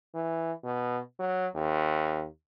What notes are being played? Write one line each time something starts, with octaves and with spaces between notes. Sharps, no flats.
E3
B2
F#3
D#2